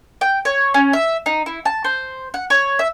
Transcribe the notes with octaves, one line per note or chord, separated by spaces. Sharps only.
G5
C#5
C#4
E5
D#4
E4
A5
C5
F#5
C#5
E5